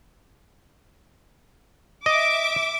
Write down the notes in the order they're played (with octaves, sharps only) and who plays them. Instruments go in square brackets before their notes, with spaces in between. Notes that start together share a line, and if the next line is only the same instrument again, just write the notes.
[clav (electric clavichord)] D#5 [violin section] E5 D6